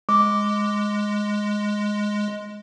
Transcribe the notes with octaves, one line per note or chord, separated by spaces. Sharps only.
G#3 D6